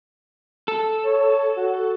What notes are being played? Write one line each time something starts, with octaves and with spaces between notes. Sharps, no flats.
A4
C#5
F#4